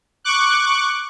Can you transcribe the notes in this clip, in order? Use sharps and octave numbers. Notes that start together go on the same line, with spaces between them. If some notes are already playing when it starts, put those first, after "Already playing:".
C#6 D6 F#6